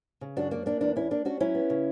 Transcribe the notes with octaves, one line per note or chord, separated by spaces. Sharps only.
C#3
F#2 D4 F#4
A#3 D4
A#3 D4
E2 D4
E2 C#4 E4
A#3 D4
C#4 D4 F#4
F#3 C#4 E4
B3
C#3